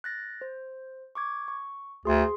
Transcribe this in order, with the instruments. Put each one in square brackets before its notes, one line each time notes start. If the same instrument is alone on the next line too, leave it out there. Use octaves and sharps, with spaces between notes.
[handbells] F#6 A6 A#6
C5
C#6 D6 G#6
C#6
[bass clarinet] D2 [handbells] G#4 C6